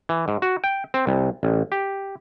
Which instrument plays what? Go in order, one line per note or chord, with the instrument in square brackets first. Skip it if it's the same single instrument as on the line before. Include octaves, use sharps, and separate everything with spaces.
[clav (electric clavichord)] E3
G#2
F#4
G5
C4
C2
A1
G4